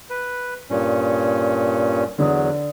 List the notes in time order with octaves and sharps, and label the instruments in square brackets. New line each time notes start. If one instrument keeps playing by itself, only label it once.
[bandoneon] B4
G2 A#2 C#4
[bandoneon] E2 F#3 [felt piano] D3 D#6